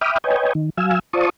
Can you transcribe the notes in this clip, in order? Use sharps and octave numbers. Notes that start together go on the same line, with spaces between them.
E5 G5 B5 D6 D#6 F6
B4 C#5 D#5 G5 G#5
D#3
F#3 F5 G#5 E6
F4 C5 D5 A5 C#6 D#6